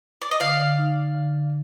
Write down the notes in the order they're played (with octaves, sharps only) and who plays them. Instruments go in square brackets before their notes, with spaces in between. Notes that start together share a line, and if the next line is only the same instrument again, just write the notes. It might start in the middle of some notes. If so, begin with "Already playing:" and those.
[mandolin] D5
D#5
[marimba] D3 [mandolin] D5 F5
[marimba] D3
D#4
D3
D3
D3